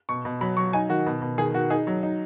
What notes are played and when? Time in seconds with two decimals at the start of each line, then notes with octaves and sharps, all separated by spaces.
0.09 B2 C#6
0.25 B2
0.41 F#3 B5
0.57 F#3 C#6
0.73 D#4 G#5
0.89 D#3 F#4
1.06 B2
1.22 B2
1.38 D#3 G#4
1.54 D#3 F#4
1.70 D#4 G#4
1.87 F#3
2.03 D#4